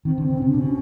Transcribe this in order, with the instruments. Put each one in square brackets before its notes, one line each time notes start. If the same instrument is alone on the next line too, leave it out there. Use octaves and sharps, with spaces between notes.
[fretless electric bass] D#3 [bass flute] C4
[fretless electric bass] D3
[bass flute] C4
[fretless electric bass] C#3
[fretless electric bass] C3 [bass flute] C#4
[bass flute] D4
[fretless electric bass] B2 [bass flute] C#4